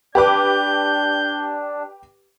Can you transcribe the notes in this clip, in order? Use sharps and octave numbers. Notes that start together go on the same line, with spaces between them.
D4 G4 B4 D6 G6